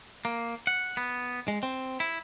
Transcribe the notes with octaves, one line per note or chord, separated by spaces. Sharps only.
A#3
F#5
B3
G#3
C4
E4